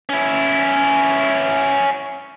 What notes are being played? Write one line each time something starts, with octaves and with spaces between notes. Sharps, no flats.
C#4 E4